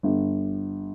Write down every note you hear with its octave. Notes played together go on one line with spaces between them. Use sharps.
G1